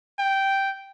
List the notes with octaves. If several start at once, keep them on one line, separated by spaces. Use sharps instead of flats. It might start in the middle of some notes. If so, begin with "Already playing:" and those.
G5